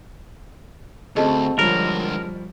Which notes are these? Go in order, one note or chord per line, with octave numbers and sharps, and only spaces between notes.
D2 C4 F#4 G#4 A4 D#5 A5
D3 F3 G3 G#3 A#4 C#5